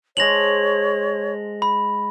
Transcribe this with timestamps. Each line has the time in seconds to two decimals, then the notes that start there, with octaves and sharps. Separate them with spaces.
0.17 G#3 C5 C#5 A5 A#6 F7 F#7
1.62 B5